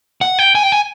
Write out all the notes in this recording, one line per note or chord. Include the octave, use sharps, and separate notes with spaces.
F#5
G5
G#5
G5
G#5